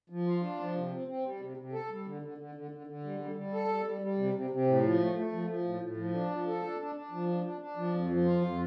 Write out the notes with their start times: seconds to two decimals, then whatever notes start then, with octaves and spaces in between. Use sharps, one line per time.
0.10 F3
0.27 F4
0.42 D4
0.59 F3
0.75 C3
0.92 C4
1.08 C4
1.24 G3
1.40 C3
1.57 C3
1.73 A4
1.89 G3
2.06 D3
2.22 D3
2.38 D3
2.55 D3
2.71 D3
2.87 D3
3.04 G3
3.19 G3
3.36 G3
3.53 A4
3.68 G3
3.85 G3
4.01 G3
4.18 C3
4.34 C3
4.50 C3
4.67 A2
4.83 F3
4.99 A3
5.15 A3
5.32 F3
5.48 F3
5.64 A2
5.81 A2
5.97 F3
6.13 D4
6.31 F3
6.47 A4
6.63 D4
6.79 D4
6.95 D4
7.11 F3
7.28 D4
7.44 D4
7.61 D4
7.76 F3
7.94 F2
8.10 F3
8.25 F4
8.42 F2